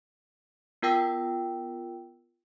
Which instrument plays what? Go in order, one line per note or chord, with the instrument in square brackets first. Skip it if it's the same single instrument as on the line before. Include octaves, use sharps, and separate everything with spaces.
[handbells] B3 F4 A#4 G5 E6 A#6